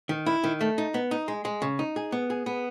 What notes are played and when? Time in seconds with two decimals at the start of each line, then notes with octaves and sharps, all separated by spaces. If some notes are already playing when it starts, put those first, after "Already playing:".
0.09 D#3
0.26 E4
0.44 D#3
0.61 A3
0.78 D#4
0.94 B3
1.11 D#4
1.28 G#3
1.45 G#3
1.62 C#3
1.79 D#4
1.96 G#4
2.12 B3
2.30 G#4
2.46 B3